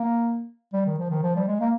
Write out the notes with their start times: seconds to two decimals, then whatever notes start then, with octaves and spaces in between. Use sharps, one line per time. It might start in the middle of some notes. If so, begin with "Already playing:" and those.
Already playing: A#3
0.73 G3
0.86 D#3
0.98 F3
1.10 D#3
1.22 F3
1.36 G3
1.47 G#3
1.60 A#3